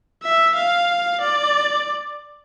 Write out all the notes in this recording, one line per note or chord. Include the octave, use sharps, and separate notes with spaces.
E5
F5
D5